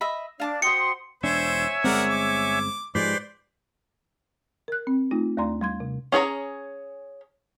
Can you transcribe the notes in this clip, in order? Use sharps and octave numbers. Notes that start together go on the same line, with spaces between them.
D#5 E5 B5
D4 D5 F5 A5 D6
F#4 C5 G5 C6 D#6 C#7
E1 D4 C5 C#5 E5 G#5
G1 G#3 C4 A#4 D5 F#5
D6
G#2 F3 G#3 G4 B4 C5 D5
A#4 F#6
C4
A3 D#4 F4
D#2 A3 D5 A#5 C6
G3 C6 G#6
C3
C#4 G#4 C#5 A#5